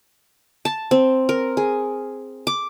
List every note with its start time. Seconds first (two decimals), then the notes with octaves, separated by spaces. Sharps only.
0.65 A5
0.91 C4
1.29 A#4
1.57 G#4
2.47 D6